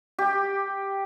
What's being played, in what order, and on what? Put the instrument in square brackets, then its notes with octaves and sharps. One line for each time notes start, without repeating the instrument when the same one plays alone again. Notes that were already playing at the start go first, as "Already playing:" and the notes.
[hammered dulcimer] G4